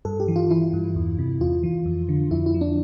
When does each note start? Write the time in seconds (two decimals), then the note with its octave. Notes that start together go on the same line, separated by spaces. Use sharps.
0.05 G2 A4
0.20 G4
0.28 E3
0.36 F4
0.50 E3 E4
0.73 G2
0.96 E2
1.18 C3
1.41 E2 F4
1.63 E3
1.86 F2
2.09 D3
2.31 F2 E4
2.46 E4
2.54 F3
2.61 D4